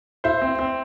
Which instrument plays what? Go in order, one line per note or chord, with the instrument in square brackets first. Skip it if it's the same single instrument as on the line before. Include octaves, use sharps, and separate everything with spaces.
[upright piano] E4 [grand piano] C5
[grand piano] C4
C4